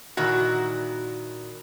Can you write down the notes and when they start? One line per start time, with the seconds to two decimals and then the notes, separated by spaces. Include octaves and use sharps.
0.17 A#2 D#3 E4 F#4